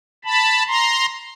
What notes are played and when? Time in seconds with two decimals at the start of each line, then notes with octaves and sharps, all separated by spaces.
0.25 A5 B5
0.68 A#5 C6